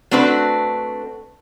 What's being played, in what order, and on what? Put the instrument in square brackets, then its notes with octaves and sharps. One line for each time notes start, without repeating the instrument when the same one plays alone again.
[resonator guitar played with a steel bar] A3 C4 D4 F#4 B4